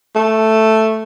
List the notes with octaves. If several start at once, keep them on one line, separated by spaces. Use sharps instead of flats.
A3